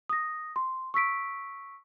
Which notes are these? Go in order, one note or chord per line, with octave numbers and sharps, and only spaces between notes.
D#6 A#6
C6
C#6 E6 B6 D7